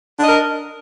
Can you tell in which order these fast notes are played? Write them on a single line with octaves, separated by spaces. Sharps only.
D4 D#5 A#4